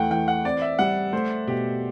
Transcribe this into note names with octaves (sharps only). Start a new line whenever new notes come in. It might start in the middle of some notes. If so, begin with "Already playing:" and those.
Already playing: E2 A3 F#5 G5
E3 G5
F#5
C4 D5
E5
G3 F#5
A3 C5
B2 G4